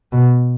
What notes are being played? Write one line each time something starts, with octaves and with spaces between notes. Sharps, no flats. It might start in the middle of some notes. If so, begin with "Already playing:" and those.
B2